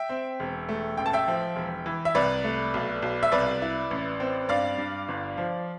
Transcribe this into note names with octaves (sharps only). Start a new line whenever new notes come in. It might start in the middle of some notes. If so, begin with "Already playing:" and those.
Already playing: E5 G5
C4
E1
A3
A1 G5
A5
E5 G5
F3
E1
E3
E5
C2 B4 D5
A3
B1
B1
E5
C2 B4 D5
E4
A1
C4
G2 D5 F5
G2
G1
F3